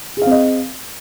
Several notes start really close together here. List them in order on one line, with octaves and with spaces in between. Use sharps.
G#4 F5 C4 D#5